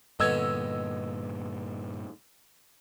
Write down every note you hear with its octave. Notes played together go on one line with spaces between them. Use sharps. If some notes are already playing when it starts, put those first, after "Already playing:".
G2 A#2 D3 B3 C#4 D#5 E6 G#6